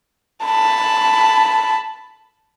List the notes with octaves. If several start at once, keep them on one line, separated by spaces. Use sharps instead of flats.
A5 B5